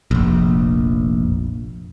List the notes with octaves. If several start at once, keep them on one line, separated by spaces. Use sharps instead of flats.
F1 A#1